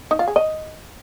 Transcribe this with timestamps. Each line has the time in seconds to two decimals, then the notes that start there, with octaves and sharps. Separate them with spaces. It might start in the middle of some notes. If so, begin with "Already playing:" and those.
0.11 D#4
0.19 F4
0.28 G#4
0.36 D#5